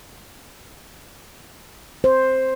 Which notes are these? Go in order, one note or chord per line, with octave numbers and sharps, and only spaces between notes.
C5